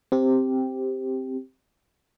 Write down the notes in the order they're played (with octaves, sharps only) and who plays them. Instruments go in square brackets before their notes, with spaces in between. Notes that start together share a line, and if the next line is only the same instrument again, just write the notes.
[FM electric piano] C4 G4